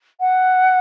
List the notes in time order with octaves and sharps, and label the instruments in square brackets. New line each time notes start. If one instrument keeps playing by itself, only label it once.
[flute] F#5